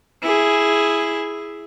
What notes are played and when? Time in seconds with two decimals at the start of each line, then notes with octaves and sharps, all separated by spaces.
0.22 E4 G#4